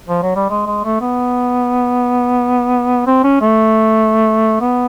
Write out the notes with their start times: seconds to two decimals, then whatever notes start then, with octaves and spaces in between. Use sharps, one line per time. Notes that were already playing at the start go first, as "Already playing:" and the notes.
0.08 F3
0.23 F#3
0.36 G3
0.50 G#3
0.67 G#3
0.85 A3
1.01 B3
3.06 C4
3.24 C#4
3.41 A3
4.61 B3